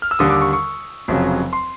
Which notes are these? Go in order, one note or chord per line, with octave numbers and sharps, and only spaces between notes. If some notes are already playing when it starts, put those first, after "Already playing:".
F6
E6
D#2 D3 G3 D#6
D6
C#6
C#6
F1 F2 C#3 F#3
C6